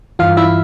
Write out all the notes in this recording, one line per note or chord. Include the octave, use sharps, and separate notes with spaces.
G2 E3 F4 F5
E4 E5